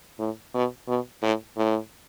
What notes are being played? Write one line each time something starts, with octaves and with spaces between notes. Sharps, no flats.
A2
B2
B2
A2
A2